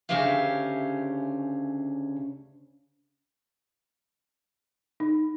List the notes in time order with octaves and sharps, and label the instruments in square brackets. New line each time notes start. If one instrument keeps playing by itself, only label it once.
[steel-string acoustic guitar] D2 C#3 C#4 G4 E5 F5
[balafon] D#4